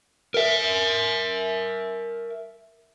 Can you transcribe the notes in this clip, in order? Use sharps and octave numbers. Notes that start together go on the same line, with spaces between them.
A#4 E5